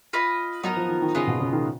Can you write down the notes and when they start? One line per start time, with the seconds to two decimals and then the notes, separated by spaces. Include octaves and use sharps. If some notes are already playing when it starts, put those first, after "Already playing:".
0.13 F4 B4 D#5
0.63 F#3 B3 D#4 A#4
0.77 F3
0.89 D#3
1.02 D#3
1.15 C#3 B3 F4 G#4 D#5
1.27 B2
1.40 C#3
1.53 D#3